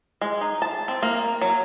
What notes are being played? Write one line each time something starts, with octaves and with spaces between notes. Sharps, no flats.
G#3
D#4
A5
C4
A#3
F#3